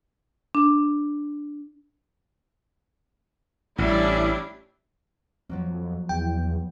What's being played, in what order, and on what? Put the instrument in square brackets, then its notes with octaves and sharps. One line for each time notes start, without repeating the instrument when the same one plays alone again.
[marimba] D4
[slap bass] A1 [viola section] G3 E4 E5 [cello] C#4 D4
[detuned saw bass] F2 [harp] F3 F#3 A#3
[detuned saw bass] E2 [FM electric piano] G5